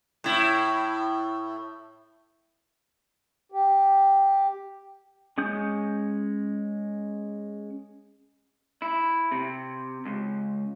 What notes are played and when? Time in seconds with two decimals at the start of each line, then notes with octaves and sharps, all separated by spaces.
0.24 A2 E4
3.52 G4
5.38 G#3 C#4 D#6 G6
8.82 E4
9.32 C3
10.05 C#2